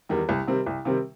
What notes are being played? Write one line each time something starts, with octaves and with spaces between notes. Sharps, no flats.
E2 D#3 G3
C2
C3 D#3 G3 C4
C2
C3 D#3 G3 C4